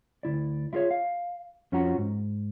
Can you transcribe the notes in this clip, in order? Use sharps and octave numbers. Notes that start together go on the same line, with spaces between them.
D2 C3 E4 D5
E4 F4 G#4 C#5 E5
F5
F2 C#4 F4 F#4 F#5 A#5
G#2